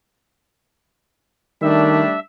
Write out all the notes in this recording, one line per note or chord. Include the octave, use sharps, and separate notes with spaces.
D#3 G3 A3 D4 E5